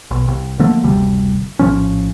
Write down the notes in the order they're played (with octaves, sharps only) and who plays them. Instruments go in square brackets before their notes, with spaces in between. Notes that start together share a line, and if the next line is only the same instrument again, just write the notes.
[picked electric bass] B1
C2
D3 F3 A3 A#3
F#1 D2 C3 G3
A#1 A2 F3 C#4